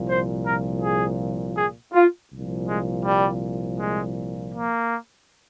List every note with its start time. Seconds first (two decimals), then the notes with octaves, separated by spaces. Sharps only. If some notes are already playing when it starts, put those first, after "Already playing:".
Already playing: C2 A#2 F3
0.09 C5
0.46 A#4
0.82 G#4
1.57 G#4
1.93 F4
2.31 C2 A#2 F3
2.69 G#3
3.05 G3
3.80 G#3
4.54 A#3